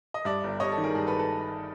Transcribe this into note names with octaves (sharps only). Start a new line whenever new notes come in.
D#5
G2 D5 E5
G1
G3 C#5 D#5
A4
D#3
G#4 A#4
G2 G#4
A4 B4
A4 B4